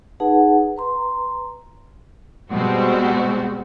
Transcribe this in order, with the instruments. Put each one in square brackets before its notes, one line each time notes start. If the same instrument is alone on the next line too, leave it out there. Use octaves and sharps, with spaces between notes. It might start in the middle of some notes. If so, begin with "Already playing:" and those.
[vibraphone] D#4 G#4 B4 F#5 A5
B4 A#5 C6
[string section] B2 G3 G#3 C4 F#4